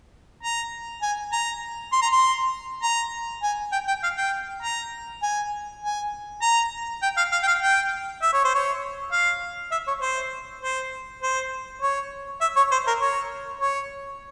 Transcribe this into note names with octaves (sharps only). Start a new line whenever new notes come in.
A#5
G#5
A#5
C6
A#5
C6
A#5
G#5
G5
G5
F5
G5
A#5
G#5
G#5
A#5
G5
F5
F5
G5
F5
G5
E5
C#5
C5
C#5
F5
E5
C#5
C5
C5
C5
C#5
E5
C#5
C5
A#4
C#5
C#5